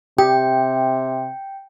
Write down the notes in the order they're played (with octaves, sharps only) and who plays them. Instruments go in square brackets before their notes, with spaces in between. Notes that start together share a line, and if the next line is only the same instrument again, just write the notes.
[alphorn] C3 [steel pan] G4 [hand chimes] G5